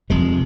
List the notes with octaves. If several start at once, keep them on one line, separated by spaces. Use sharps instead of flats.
F1 F2 C3 G#3